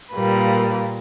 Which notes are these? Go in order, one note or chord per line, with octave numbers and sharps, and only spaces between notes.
A#2 G3 A#3 B4